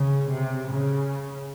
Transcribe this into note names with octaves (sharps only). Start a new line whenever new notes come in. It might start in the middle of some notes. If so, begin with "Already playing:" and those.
Already playing: C#3
C3
C#3